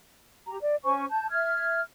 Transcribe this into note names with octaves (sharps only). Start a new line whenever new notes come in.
G4 A#5
D5
C#4 C5 G#5 C#6
A5 G6
E5 F6 G#6